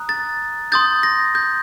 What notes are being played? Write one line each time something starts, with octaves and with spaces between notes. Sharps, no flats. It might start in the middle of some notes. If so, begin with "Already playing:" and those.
Already playing: A#5 D#6 F#6
A6
C6 D#6 G6 A6
A#6
G6